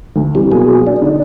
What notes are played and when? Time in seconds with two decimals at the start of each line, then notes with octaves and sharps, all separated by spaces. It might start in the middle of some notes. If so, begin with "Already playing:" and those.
0.16 D2
0.35 C3 E3 G3
0.52 B2 F#3 A#3 G#4
0.87 D4
1.02 D3 D#4